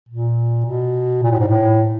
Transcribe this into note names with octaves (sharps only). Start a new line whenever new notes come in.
A#2
B2
A#2
A2
G#2
A2